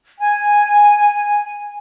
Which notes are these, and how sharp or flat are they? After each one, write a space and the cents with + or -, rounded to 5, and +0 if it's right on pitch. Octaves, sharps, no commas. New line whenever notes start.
G#5 -5